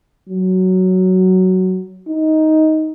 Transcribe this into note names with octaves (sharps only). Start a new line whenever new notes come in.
F#3
D#4